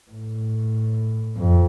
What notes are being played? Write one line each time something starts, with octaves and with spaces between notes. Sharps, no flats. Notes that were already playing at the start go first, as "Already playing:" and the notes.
A2
F2